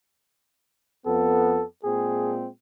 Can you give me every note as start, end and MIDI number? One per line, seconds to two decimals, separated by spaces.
1.06 1.61 41
1.06 1.61 59
1.06 1.65 69
1.84 2.47 46
1.84 2.47 56
1.84 2.47 60
1.84 2.34 68